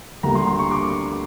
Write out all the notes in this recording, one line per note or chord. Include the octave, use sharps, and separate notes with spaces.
D2 D3 G3 A#3 A#5
C6
C6
C#6
D6